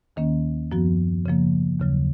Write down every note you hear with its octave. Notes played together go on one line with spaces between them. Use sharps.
D#2 D#3 A#3 C#4
F#2 F3 B3 F#4
C#3 F3 A#3
D#2 C#3 F#3